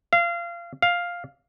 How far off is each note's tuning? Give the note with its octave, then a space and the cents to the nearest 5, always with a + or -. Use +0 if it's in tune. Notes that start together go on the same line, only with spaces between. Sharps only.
F5 -25
F5 +5